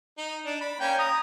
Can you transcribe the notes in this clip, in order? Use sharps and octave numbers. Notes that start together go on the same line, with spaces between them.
D#4
D4
B5
A#3 C#4 G5
A#5 D#6